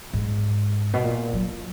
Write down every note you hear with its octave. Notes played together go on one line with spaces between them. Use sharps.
G#2
B2
A#2
F#3